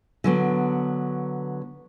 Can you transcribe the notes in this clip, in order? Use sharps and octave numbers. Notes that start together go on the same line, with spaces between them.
D3 F#3 B3